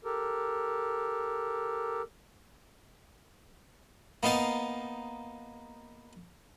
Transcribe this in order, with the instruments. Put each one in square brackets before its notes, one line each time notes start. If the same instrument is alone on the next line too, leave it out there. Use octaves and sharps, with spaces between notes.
[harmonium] G4 A4 A#4
[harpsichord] A#3 B3 D#4 F5 A5